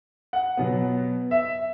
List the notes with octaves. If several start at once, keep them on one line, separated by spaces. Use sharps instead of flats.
F#5
B2 F#3 B3
E5